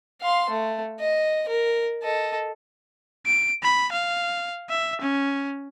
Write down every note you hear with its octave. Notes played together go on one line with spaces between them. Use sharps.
F5 C6
A3
D#5
A#4
A4 D#5
D7
B5
F5
E5
C#4